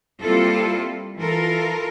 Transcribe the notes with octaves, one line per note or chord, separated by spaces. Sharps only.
G3 A#3 C4 E4 F4 A4
E3 F4 A4 A#4